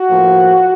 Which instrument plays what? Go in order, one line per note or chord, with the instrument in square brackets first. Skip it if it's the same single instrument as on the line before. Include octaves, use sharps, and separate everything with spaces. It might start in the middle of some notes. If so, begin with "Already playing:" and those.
Already playing: [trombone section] F#4
A2 F3 A#3